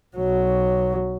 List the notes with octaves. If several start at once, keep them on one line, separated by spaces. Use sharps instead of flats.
B1 F#3